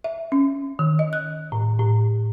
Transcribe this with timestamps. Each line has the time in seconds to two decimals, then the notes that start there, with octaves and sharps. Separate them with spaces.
0.04 E5
0.32 C#4
0.79 D#3
0.99 D#5
1.13 F#6
1.52 A2
1.80 A2